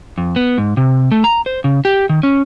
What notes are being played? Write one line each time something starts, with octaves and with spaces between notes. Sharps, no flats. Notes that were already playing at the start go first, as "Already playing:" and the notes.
F2
B3
G#2
C3
A3
A#5
C5
C#3
G4
D#3
C#4